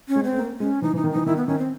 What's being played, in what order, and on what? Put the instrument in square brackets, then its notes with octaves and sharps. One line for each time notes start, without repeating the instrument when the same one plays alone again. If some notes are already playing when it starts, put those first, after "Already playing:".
[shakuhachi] C#4
[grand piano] G#3
[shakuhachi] C4
[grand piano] A3
A#3
[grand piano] G#3 [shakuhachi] C#4
[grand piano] E3 [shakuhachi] D#4
[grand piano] E3
[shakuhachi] D#4
[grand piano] D#3
[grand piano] E3 [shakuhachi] D#4
[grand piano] D#3 [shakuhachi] E4
[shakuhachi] B3
[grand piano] D#3 [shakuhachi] C#4
[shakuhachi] C4